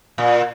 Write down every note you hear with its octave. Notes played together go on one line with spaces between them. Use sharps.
A#2